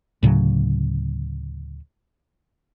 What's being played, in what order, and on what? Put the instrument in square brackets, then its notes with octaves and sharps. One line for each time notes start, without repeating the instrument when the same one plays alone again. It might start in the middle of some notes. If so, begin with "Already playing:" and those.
[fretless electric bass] D2 A2 C#3 F#3